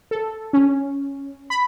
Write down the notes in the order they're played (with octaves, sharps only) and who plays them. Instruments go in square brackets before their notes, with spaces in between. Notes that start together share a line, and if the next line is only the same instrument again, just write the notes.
[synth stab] A4
C#4
B5